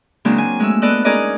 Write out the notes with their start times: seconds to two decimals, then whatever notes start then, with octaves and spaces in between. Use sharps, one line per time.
0.25 C#3 F#3 G#3 A#3 C4 D4
0.38 G#5
0.60 G#3 A3 E6
0.82 A3 B3 A4 D5 D#5 F#6
1.05 C#4 D#4 G#4 A#4 D5 D#5